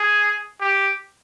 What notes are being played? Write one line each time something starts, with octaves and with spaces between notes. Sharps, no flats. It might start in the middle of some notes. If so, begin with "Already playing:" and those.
Already playing: G#4
G4